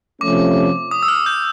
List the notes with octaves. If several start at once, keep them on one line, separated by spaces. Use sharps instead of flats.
C3 F3 A3 C#4 D6
D#6
E6
F6
G6